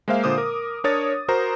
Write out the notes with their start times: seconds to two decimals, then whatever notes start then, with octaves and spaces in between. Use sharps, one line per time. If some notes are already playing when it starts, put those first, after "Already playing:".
0.08 G#3 A#3 C5 E5 F5
0.24 A#2 D3 C5 D6 D#6
0.38 A#4
0.84 D4 A#4 C#5 D#6 A6
1.28 F#4 A#4 C5 A#5